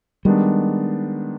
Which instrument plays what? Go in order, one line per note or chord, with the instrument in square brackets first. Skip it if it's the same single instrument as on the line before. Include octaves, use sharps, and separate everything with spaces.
[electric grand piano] D#3 G#3 B3 D4 [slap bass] G3